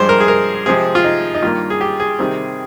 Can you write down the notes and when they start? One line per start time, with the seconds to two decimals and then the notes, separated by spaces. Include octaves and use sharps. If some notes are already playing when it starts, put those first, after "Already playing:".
Already playing: G2 F3 G#3 C5
0.09 A#4
0.20 G#4
0.28 A#4
0.66 C3 F3 G#3 C4 G#4
0.95 F4
1.04 D#4
1.34 D#4
1.42 G2 D#3 A#3 F4
1.70 G#4
1.81 G4
2.00 G#4
2.19 C3 D#3 G3 C4